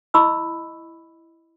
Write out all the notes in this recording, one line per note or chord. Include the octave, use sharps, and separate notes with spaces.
E4 D#5 B5 C#6 E6